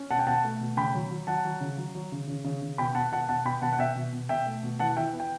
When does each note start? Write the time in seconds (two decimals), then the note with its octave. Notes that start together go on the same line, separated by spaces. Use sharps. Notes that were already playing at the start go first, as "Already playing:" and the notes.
Already playing: C#4
0.10 B2 F#5 A5
0.19 G5
0.27 B2 F#5 A5
0.44 A3
0.60 B2
0.77 C#3 G5 B5
0.95 F#3
1.11 F#3
1.27 F#3 F#5 A5
1.45 F#3
1.60 C#3
1.77 F#3
1.95 F#3
2.12 C#3
2.28 C#3
2.44 C#3
2.62 C#3
2.78 B2 G5 B5
2.95 B2 F#5 A5
3.12 B2 F#5 A5
3.28 B2 F#5 A5
3.45 B2 G5 B5
3.62 B2 F#5 A5
3.73 F#5
3.79 B2 E5 G5
3.96 B2
4.13 B2
4.29 B2 E5 G5
4.46 A3
4.63 B2
4.79 E3 F#5 A5
4.97 E3 E5 G5
5.13 B3
5.20 G5